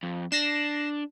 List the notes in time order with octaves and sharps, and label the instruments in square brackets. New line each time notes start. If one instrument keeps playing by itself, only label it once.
[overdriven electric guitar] F2
[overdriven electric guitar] D4 [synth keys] A#6 C7 E7